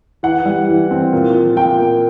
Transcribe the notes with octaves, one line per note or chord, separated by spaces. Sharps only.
E3 F#5
G3
E3
C4
A#2
F3
A#2 G5
A#3